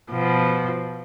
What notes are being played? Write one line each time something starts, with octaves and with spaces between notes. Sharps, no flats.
B2 F3